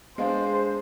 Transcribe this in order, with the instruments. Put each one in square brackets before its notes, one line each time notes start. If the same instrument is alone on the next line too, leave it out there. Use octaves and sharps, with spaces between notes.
[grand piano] G#3 D4 [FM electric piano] B3 G#4 [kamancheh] C5 [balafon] D#5 F5